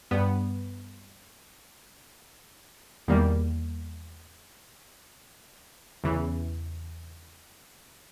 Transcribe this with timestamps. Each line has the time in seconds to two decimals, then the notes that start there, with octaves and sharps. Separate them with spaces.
0.11 G2 G3 B3
3.08 E2 D#3 G3 A#3
6.04 E2 C#3 E3